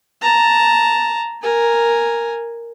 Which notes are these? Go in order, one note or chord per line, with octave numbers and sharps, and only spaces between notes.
A5 A#5
A#4 G#5